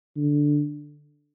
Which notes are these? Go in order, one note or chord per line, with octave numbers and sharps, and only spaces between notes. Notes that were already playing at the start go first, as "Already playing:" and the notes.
D3